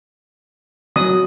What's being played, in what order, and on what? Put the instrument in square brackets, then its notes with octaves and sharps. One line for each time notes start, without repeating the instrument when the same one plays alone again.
[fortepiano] F#3 [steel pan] D#6